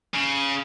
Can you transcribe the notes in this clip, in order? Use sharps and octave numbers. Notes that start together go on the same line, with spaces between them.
C#3